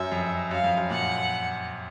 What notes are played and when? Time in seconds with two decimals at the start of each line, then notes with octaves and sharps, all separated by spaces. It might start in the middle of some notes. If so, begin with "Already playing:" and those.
Already playing: F#2 E5
0.12 F2
0.51 F#2 F5
0.64 F2
0.77 F#2
0.90 A#2 F#5